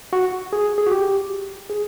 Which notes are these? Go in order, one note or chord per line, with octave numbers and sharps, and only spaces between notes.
F#4
G#4
G#4
F#4
G4
G#4